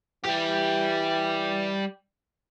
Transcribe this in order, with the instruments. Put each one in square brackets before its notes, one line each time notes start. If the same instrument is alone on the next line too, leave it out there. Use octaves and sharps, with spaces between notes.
[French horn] E3 [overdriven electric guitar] G3 G4